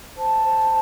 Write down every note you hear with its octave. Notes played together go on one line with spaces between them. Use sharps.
C5 A5
C5